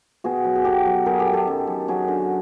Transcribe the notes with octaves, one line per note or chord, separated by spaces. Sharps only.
B2 F#4 G#4
F#3
G#4
B2 G4 A4
F#3
F#3 G#4 A#4
G4 A4
D#3
G4 A4
F#2
F#2
F#3 F#4 G#4
D3